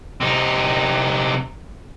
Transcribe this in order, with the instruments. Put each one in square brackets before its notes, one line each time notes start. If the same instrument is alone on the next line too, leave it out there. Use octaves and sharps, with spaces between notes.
[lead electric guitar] C3 D#4